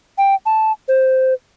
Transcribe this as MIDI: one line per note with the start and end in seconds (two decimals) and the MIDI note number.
0.18 0.35 79
0.46 0.72 81
0.88 1.34 72